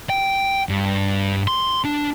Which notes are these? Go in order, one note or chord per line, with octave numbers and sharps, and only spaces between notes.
G5
G2
C6
D4